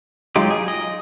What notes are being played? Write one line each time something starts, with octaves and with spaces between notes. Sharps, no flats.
F#3 G#3 D#4 F4 G4
G#4
D#5